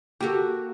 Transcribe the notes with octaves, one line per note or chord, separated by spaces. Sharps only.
A#3 F#4 G4 A4